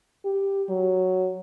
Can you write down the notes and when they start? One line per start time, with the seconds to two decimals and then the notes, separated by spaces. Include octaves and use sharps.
0.25 G4
0.69 F#3